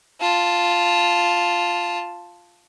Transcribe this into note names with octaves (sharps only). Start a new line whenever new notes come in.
F4 A5